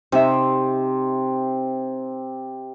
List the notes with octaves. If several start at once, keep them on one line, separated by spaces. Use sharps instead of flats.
C3 D#4 E5